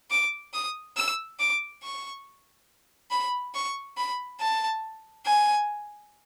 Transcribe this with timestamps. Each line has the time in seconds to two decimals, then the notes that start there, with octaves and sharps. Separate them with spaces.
0.11 D6
0.54 D#6
0.97 E6
1.39 D6
1.83 C#6
3.11 B5
3.55 C#6
3.97 B5
4.40 A5
5.26 G#5